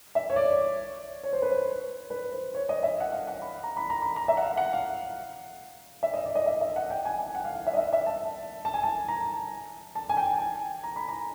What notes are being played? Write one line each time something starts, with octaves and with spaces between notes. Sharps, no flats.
E5
C#5
D5
C#5
C5
B4
C5
B4
C5
C#5
D#5
E5
F#5
F5
F#5
B5
A#5
B5
A#5
B5
A#5
E5
F#5
F5
F#5
F5
E5
D#5
D5
D#5
E5
E5
F#5
G5
G#5
G#5
F#5
F5
F5
E5
D#5
E5
E5
A5
A5
G#5
A5
A#5
A5
G#5
G5
G#5
A#5
B5
A#5